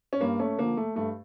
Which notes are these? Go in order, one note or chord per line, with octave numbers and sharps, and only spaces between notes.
C#4
G2 A#3
A3 C#4
D3 F3 A#3
A3
G2 A3